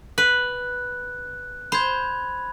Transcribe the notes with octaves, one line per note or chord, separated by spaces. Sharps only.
B4 F#6
C5 B5 G#6